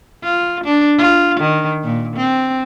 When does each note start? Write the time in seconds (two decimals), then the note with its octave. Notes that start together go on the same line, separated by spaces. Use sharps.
0.23 F4
0.64 D4
0.98 F4
1.40 D#3
1.84 A#2
2.16 C4